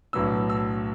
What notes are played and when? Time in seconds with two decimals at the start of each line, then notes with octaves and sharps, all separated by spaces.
0.13 B1 A2 F#3 B3 D4 E6
0.49 E6